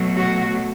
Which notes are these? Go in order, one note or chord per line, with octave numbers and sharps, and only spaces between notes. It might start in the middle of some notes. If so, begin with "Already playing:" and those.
Already playing: B2 F#3 A3
F#4